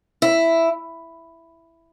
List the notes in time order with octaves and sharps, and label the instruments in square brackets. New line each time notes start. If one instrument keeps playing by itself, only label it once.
[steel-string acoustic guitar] E4